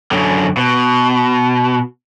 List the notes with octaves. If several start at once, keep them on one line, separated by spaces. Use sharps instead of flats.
F#2 D3
B2